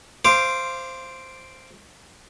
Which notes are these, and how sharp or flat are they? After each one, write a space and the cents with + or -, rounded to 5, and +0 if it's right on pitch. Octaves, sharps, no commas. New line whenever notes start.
C5 +0 F5 -25 D6 +0